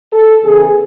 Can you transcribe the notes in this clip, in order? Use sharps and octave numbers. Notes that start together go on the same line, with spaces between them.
A4
E2 C#3 E3 G#4